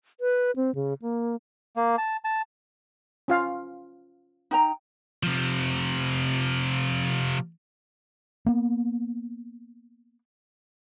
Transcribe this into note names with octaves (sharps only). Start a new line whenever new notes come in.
B4
C4
C#3
A#3
A#3
A5
A5
C#4 F4 F5
D#4 G5 A#5
C3 F3
A#3 B3